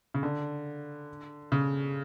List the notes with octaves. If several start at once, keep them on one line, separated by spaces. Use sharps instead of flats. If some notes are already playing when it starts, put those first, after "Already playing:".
C#3
D3
C#3